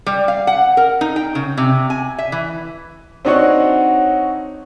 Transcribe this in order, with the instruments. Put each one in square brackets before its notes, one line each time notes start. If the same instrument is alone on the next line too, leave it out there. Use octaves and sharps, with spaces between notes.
[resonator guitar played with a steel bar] G3
F5
F#5
A#4
D#4
G5
C#3
C3
G#5
E5
E3
[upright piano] C4 D4 D#4 F#4 C#5 F#5